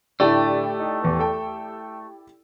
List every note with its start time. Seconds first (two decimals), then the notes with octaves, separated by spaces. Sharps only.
0.20 A2 D3 A3 E4 G4 D5
0.80 D#4
1.02 E2 B3
1.19 A4 G5 A5